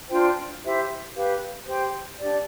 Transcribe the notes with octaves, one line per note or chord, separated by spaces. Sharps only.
D4 F4 C5 G5
E4 G4 C5 E5
G4 B4 F5
G4 C5 G5
D4 G4 D5